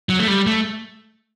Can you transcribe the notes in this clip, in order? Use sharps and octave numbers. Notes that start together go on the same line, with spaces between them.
F#3
A3
G3
A3